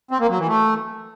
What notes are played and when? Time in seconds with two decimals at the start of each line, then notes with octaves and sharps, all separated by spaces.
0.11 C4
0.20 A#3
0.29 F#3
0.38 E3
0.48 A3